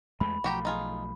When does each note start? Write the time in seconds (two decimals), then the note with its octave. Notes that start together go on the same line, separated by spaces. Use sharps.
0.20 E2 G#3 A3 B5
0.44 B1 F3 A3 F#4 G4 A#5
0.65 D#4 F4 G#4